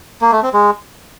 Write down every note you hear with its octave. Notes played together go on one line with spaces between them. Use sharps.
A#3
A3
C4
G#3